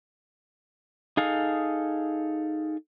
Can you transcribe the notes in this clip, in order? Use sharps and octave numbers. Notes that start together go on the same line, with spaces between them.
D#4 G#4 A4 F5